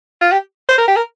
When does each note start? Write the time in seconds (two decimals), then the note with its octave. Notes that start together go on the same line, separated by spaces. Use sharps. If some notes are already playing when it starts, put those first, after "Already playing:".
0.21 F4
0.32 G4
0.69 C5
0.78 A#4
0.88 G4
0.96 A#4